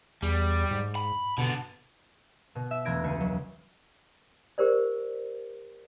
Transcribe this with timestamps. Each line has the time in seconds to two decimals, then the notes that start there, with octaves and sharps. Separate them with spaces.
0.22 E2 G3
0.71 G#2
0.95 B5
1.38 B2 D3 B3
2.55 B2
2.71 E5
2.85 E1 A3 B4 G#6 A#6 D7
3.04 C#2 G#5 C7 C#7
3.20 F#3
4.58 G4 A#4 C5 D5